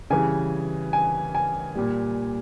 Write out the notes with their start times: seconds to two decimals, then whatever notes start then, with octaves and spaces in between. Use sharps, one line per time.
0.10 C#3 E3 G3 G#5
0.93 G#5
1.35 G#5
1.76 A#2 G3